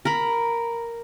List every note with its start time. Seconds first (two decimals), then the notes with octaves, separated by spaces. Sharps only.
0.05 A#4 A#5 B5